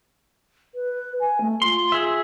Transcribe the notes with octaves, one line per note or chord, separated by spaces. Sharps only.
B4
G#5
A3
F4 C6
G#4 E5